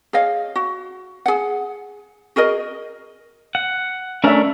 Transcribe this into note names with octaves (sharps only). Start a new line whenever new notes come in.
G#4 C#5 D#5 F5
F#4
G#4 F#5
F#4 G#4 A#4 D#5
F#5
A3 C#4 D4 A#4 E5